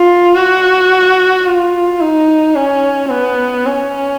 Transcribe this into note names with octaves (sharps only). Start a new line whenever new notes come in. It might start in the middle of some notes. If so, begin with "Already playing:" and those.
Already playing: F4
F#4
F4
D#4
C#4
B3
C#4